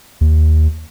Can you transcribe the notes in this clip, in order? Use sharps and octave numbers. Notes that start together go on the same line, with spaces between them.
D#2